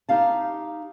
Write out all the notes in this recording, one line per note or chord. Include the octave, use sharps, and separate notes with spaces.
D#4 G4 F5 A5